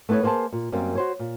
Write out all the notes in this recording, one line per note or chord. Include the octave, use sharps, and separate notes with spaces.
A3 B3 E4 B4 C#5
A#3 G#4 C5 G#5 A5
A#2
F#2 G3 A#3 C4
F#4 C5 C#5
A#2